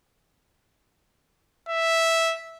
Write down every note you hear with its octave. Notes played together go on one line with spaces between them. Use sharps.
E5